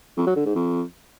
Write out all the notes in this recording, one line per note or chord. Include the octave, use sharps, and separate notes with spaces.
F2
F#3
D3
G#2
F2